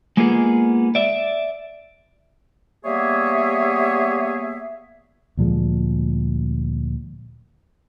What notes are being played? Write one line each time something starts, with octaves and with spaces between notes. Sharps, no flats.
G#3 A#3 B3 D#4 F4 G#4
D5 E5
G3 A#3 B3 G#4 C#5 E5
D2 A#2 F3 G#3